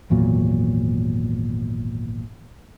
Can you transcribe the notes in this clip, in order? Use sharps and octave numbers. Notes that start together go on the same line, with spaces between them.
G#1 E2 A#2 F#3